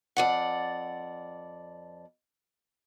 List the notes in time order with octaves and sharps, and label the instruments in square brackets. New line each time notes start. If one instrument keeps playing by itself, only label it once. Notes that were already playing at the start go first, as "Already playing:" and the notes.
[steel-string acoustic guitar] F2 D5 F#5